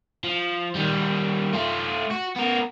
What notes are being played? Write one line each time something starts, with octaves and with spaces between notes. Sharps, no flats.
F3
D#3 G3
A3 F4
F#4
B3 A#4